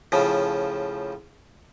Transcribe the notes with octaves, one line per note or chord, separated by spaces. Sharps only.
A2 C#3 F3